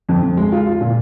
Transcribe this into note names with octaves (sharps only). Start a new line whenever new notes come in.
F2
F2
G#3
F4
F4
A#2